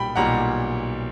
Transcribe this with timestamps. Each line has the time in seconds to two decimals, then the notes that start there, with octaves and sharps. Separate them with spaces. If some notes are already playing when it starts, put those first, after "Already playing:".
Already playing: B1 A#2 G3 G5 B5
0.16 B1 A#2 G3 F#5 A#5